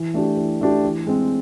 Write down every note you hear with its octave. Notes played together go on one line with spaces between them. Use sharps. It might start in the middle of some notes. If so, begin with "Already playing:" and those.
Already playing: E3
A3 D4 G4
E3
A3 D4 G4
E3
G#3 C4